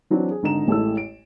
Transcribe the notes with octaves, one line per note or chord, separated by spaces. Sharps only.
E3 F#3 C4 D4
G#4
G#1 D3 D#4 A#5 E7
A1 G#3 A3 E4 E6
D7